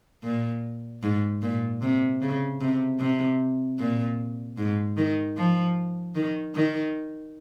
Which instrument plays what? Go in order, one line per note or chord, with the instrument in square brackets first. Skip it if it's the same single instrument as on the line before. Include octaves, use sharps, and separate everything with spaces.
[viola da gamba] A#2
G#2
A#2
C3
C#3
C3
C3
A#2
G#2
D#3
F3
D#3
D#3